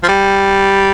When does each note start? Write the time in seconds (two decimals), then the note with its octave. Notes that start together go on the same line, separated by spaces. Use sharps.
0.03 F3
0.08 G3